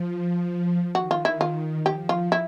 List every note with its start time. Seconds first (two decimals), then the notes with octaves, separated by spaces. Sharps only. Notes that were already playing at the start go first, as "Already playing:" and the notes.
Already playing: F3
0.95 D#3 F#4
1.11 F4
1.25 E4
1.41 F4
1.86 F3 G4
2.09 F4
2.32 E4